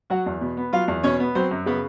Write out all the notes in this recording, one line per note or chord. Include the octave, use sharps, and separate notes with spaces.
F#3 F#4 F#5
E2
B2
B3
F#3 F4 F5
E2
B2 C#4 C#5
B3
F#3 C4 C5
F#2
C#3 B3 B4